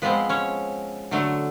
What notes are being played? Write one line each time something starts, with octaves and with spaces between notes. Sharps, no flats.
F3 G#3 B3 C4 B4
C#4 C#5
D3 F#3 A3